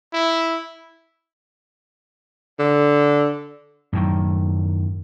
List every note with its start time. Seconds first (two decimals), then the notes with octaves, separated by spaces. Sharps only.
0.13 E4
2.59 D3
3.93 F#2 A2 D#3